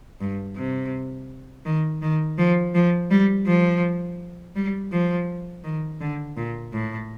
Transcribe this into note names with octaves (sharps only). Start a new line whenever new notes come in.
G2
C3
D#3
D#3
F3
F3
G3
F3
G3
F3
D#3
D3
A#2
A2